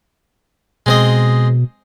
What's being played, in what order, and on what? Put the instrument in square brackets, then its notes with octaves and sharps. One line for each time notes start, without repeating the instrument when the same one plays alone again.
[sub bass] B2 [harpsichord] G#3 C4 D#5